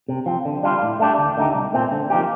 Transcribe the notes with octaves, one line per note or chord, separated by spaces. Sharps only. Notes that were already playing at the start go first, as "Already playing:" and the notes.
C3
F3 C4
D3
G3 D4 F4
A2
A3 D4 G4
D2
D3 A3 D#4 G4
C2
A#2 A3 C4
D3
F3 A#3 D#4 G4